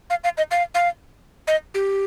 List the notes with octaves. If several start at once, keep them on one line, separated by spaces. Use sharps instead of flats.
F5
F5
D#5
F5
F5
D#5
G4